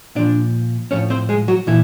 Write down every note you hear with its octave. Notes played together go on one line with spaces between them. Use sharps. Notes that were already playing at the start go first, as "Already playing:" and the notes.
A#2 F3 D4 D5
A2 F3 C#4 C#5
C4 C5
G#3 G#4
F#3 F#4
A#2 E3 E4